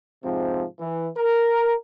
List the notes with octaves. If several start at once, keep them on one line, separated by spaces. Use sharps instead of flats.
G#2 C3 F3 C4
E3
A#4